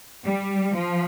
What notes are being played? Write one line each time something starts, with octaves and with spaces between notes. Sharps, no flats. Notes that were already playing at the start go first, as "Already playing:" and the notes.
G3
F3